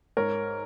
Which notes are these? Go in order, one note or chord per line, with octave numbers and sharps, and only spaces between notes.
G#2 A#4 C#5